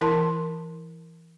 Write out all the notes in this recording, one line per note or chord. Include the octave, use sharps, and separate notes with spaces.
E3 E4 A#4 A5 C6